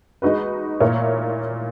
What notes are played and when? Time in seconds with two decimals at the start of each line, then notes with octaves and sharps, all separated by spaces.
0.22 G#3 D#4 F#4 B4
0.80 A#2 A#3 E4 A#4 C#5